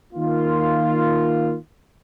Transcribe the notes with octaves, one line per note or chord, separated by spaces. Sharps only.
D#3 A#3 F4